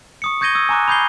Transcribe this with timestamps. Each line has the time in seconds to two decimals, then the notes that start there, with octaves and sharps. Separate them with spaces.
0.22 C#6 D#6 C#7
0.41 C#6 G6 G#6 A#6 D#7 G7
0.55 D#6 E6 G#6
0.69 G#5 A#5 D6 F#6
0.88 B5 D#6 G6 G#6 C7 G7